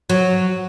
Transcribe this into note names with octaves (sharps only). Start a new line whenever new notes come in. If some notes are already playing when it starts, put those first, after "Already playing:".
F#3